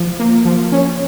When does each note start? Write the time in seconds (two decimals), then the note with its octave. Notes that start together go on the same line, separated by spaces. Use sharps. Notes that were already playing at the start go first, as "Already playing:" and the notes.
Already playing: F3
0.19 A#3
0.45 F3
0.72 C#4